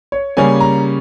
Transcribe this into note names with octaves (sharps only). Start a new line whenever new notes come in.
C#5
C#3 G3 A#3 C#4 G#5
A#5